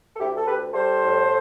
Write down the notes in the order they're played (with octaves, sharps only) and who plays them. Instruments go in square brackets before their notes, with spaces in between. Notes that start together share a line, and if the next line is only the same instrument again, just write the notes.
[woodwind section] A4
D2 E4 G4
A4
D2 G4 B4
G3 A4 C5
A2